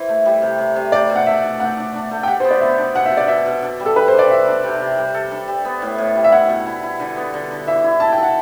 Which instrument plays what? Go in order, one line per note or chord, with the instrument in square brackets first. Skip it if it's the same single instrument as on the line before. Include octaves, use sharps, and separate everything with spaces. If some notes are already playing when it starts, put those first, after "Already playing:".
Already playing: [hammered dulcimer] E3 [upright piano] C5
[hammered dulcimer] A3
G3
C3
C3
C3
[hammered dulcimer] A3 [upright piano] D5
[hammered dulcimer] B2
[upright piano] F#5
[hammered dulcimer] A3 [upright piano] E5
[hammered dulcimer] B2
[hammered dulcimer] A3 [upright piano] F#5
[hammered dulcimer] D4
D4
A3
[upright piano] G5
[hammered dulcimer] G4 [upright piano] F#5
[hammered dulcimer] B3 [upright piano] C5
[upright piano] D5
[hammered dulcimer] B3 [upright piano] E5
[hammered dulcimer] D4
[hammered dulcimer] B2 [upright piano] F#5
[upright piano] E5
[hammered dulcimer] B2
[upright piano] D5
[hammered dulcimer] B2 [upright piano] E5
[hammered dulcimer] B2
D4
G3
[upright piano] A4
[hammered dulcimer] G3 [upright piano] B4
[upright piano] C5
[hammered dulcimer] D4
[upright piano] D5
[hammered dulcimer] F#4 [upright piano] E5
[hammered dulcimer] D4
C3
C3
G3
A4
D4
G3
B3
A2
A2
G3
[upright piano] E5
[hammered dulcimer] E4 [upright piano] F#5
[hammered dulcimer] B2
E4
E4
D3
B3
D3
D3
[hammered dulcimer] E3 [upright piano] E5
[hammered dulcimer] E4
[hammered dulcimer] A4 [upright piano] A5
[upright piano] G5
[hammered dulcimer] A4 [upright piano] F#5